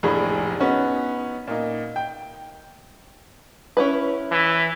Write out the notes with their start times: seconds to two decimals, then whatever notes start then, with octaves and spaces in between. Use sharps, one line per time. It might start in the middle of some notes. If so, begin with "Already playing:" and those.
0.03 F1 A#1 A2 G#4
0.60 B3 C#4 D#4 F#4
1.47 A#2 D#4
1.96 G5
3.77 C#4 E4 B4
4.31 E3